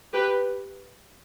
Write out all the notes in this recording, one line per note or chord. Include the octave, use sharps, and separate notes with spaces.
G4 B4